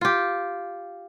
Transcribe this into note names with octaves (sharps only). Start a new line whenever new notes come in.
F4 G4